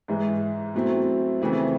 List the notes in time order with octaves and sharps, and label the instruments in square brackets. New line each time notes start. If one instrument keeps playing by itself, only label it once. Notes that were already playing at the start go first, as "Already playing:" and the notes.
[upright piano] G#2 E3 G#3
B2 F#3 A3 C4 E4
F2 C#3 E3 A3 C4